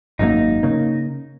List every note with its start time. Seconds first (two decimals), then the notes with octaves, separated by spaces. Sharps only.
0.19 G#1 F#2 C#3 A#3 D#4
0.63 C#3 A#3